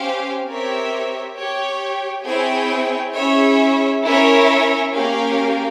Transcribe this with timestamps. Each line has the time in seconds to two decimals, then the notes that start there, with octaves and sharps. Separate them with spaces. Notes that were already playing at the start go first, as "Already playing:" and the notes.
Already playing: C#4 G4 C5 F5
0.46 C4 G4 A#4 C#5 E5
1.36 G4 C#5 G5
2.25 C4 E4 G#4 C#5 G5
3.15 C#4 E4 G#4 C#5 E5
4.04 C#4 E4 A#4 C#5 E5
4.94 A#3 C#4 G4 A#4 F5